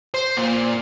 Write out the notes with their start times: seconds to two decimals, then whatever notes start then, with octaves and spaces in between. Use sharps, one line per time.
0.14 C5
0.37 A#2